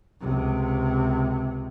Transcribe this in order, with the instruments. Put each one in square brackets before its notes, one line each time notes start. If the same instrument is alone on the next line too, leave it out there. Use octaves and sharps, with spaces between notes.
[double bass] C#2 C3